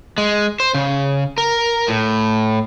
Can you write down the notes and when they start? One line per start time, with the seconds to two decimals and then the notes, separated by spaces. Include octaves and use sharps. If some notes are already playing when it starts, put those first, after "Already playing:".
0.18 G#3
0.60 C5
0.75 C#3
1.38 A#4
1.88 A2